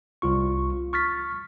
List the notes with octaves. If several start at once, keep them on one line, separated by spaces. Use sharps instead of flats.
C2 F4 C#6
C#6 F6 A6 B6